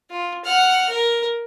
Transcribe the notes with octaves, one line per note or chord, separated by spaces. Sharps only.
F4
F#5 F6
A#4